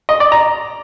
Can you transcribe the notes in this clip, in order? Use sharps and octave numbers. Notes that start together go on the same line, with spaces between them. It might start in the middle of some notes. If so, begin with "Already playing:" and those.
D#5
D5
A#5